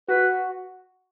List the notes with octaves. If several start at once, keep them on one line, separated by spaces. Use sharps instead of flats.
F#4 B4